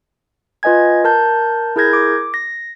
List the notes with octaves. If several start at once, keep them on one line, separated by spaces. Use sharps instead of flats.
F4 B4 D#5 G#5 G#6
A#4 A5 G6
E4 G#4 A#4 G6 G#6 A#6
D6
A#6